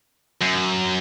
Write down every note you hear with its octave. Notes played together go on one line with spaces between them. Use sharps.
F#2